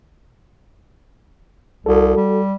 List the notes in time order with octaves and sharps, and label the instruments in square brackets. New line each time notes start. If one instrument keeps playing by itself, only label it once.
[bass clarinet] C2 [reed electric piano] F#4 A4
[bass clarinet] G3